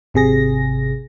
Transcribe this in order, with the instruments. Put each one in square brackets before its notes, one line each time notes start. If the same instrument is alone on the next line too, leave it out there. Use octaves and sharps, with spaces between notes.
[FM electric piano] G#1 C3 G#4 A#6